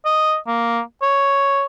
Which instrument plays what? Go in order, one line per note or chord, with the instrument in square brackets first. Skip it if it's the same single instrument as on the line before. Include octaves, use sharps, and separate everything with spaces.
[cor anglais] D#5
A#3
C#5